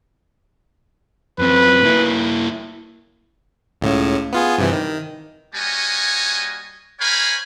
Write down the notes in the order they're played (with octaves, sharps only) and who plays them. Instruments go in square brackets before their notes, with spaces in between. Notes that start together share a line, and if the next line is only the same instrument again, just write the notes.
[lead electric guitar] F#2 C4 [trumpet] B4
[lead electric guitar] A#3 E4
[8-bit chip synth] C#2 A2 C#3
B3 F4 G#4
G2 C3 E3
D#3
[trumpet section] G3 A#3 F#4 C#5 D#5 G#5
A#4 C5 C#5 F5 G#5 B5